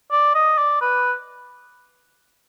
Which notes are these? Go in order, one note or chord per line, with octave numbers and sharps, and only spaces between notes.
D5
D#5
D5
B4